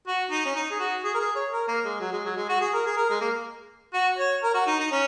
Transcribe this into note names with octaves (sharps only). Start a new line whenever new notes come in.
F#4
D#4
C#4
D#4
G#4
F#4
G#4
A#4
G#4
C#5
A#4
A#3
G#3
F#3
G#3
F#3
G#3
F#4
G#4
A#4
G#4
A#4
G#3
A#3
F#4
C#5
A#4
F#4
D#4
D#4
C#4